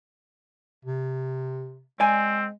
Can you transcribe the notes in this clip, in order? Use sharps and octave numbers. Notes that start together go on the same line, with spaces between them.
C3
G#3 C4 D5 G#5